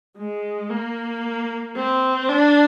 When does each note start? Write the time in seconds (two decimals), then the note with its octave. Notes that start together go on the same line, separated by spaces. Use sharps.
0.17 G#3
0.70 A#3
1.76 C4
2.29 D4